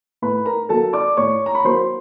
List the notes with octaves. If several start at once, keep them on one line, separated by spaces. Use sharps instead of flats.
A2 B4 B5
A#4 A#5
F#3 A#3 A4 A5
D5 D6
A2 C#5 C#6
A#5
B5
F#3 A#3 C5 C6